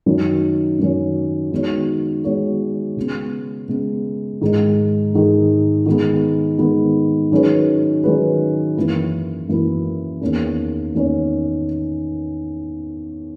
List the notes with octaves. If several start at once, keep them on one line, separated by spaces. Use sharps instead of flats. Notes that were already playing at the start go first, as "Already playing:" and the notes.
F#2 D#3 F#3 C#4
F#2 D#3 F#3 C#4
D#3 G#3 B3 F#4 C#5
D#3 G#3 B3 F#4 C#5
C#3 G#3 B3
C#3 G#3 B3
G#2 D#3 G#3 D#4
G#2 D#3 G#3 D#4
D#3 G#3 B3
D#3 G#3 B3
D#3 F#3 C#4 G#4 B4
D#3 F#3 C#4 G#4 B4
F#2 E3 A#3 E4
F#2 E3 A#3 E4
E2 D#3 A#3 C#4
E2 D#3 A#3 C#4